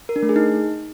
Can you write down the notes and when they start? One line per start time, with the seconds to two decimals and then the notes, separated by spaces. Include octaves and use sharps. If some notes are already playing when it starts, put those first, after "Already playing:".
0.09 A#4
0.16 D4
0.22 A3
0.29 G#4
0.36 D#4